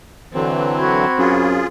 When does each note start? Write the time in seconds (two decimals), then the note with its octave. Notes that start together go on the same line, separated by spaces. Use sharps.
0.33 D3 E3 F#3 C4
0.78 F#4 B5 G#6
1.19 F#2 F4 G#4